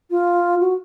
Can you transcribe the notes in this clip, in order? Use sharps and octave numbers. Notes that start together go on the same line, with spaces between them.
F4
F#4